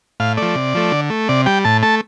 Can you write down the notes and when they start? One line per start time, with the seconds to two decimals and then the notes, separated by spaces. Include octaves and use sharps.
0.20 A2 F5
0.37 F3 A3 D5
0.55 C3
0.74 F3 A3
0.92 D3
1.10 A3
1.29 C3 D5
1.46 G3 G5
1.65 A2 A5
1.83 A3 A5